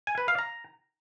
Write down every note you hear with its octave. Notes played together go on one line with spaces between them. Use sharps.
G#5
B4
F5
A#5